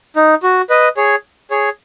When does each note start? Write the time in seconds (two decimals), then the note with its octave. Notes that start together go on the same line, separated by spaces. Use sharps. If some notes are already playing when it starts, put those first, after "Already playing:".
0.16 D#4
0.43 F#4
0.70 B4 D#5
0.97 G#4 C#5
1.51 G#4 C#5